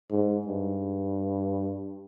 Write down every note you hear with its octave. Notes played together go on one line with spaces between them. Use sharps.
G#2
G2